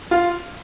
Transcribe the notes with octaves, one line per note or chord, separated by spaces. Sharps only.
F4